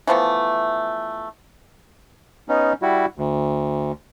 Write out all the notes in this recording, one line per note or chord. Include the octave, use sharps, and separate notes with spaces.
E3 F3 A3 B3
B3 C#4 D#4
G3 E4 F#4
D2